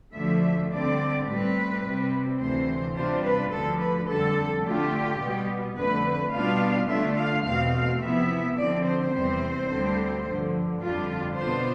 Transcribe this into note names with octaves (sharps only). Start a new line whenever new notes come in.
D2 D3 F3 A3 E5
D3 G3 C4 D5
A2 G3 C4 B4
C3 G3 C4
D2 C3 E3 C5
C3 G3 D4 F4 C5
B4
D2 D3 F3 A4
B4
F2 D3 G3 A4
D3 A3 D4 F4 G4
B2 G3 B3
F2 D3 A3 B4
B2 G3 B3 D4 F4 F5
D3 A3 D4 F4 E5
F5
E2 B2 A3 C4 F5
C3 F3 B3 E4 E5
D3 F3 C4 D5
C5
E2 C3 G3 C4 C5
D2 D3 G3 C4
G2 D3 F3
F2 D3 G3 D4 F4
B2 B3 D4 F4 C5